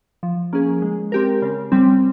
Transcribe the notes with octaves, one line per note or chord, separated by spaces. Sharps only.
F3
A#3 C#4 G#4
G#3
C4 G4 A#4
C#3
G3 C4